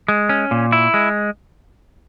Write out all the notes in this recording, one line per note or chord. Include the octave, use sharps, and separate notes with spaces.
G#3
C#4
A#2
E4
G#3